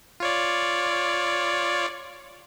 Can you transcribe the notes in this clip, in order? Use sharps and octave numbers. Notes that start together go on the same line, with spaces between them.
F4 C#5 D5